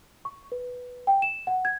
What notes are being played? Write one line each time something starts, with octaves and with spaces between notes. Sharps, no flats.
C#6
B4
G5
E7
F#5
G#6